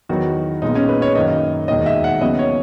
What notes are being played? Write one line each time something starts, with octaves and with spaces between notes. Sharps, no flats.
E2 D#3 F#3 B3 F#4
B1 A#2 G#3 B3 D#4
C#4
B4
C#5
F#2 D#3 A#3 D#5
E1 D#2 D#3 D#5
E5
F#5
D#2 C#3 F#3 B3 D#5
C#5